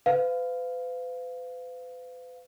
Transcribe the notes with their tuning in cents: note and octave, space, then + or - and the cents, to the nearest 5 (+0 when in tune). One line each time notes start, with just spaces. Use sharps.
B4 +40 F5 +0